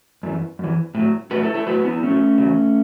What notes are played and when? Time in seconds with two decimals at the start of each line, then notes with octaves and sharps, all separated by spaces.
0.23 F#2 E3
0.59 F#2 E3
0.95 A2 F#3
1.31 A2 F#3 F#4 B4
1.43 E4 A4
1.54 E4 A4
1.66 A2 F#3 F#4 B4
1.84 B3 E4
2.02 A2 F#3 A3 C#4
2.38 E2 C#3 F#3